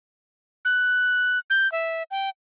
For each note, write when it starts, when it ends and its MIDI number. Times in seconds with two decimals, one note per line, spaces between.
0.65 1.39 90
1.50 1.70 91
1.72 2.03 76
2.11 2.30 79